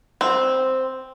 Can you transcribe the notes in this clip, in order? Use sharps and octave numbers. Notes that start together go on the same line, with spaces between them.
C4